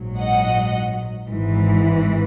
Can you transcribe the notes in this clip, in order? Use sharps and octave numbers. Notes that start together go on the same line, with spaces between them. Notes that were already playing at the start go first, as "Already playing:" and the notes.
Already playing: A#1 G#2 F#3
D#5 F#5
G#1 G#2 E3